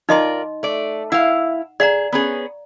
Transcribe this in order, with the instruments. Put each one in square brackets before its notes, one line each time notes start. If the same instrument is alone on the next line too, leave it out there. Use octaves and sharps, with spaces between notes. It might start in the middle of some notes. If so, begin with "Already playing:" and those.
[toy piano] D#4 D#5 C6 [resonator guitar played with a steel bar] F4 A#4 D5
[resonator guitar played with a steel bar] A3 D5
[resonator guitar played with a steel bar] E4 F5 [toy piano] F#5
[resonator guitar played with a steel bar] G#4 [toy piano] D5 F5 A#5
[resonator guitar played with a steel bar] B3 C#4 G#4